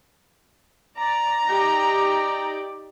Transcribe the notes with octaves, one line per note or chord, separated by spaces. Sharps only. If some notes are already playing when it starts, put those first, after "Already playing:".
D5 A#5
D#4 G4 D5